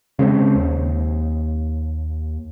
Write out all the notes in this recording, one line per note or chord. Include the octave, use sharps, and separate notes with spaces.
C#3 G#3 B3 C4
D#2